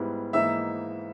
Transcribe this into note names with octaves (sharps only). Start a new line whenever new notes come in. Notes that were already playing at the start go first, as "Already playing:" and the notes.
Already playing: G#2 G3 B3 E4
G#2 E3 A#3 D#4 E5 E6